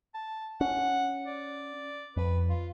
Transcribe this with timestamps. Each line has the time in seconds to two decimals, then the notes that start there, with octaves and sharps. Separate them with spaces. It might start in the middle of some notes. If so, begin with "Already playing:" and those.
0.14 A5
0.61 C#4 F#5
1.26 D5
2.17 F2 B4
2.49 F4